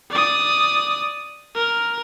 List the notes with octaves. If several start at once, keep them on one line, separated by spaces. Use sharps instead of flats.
D5 D#6
A#4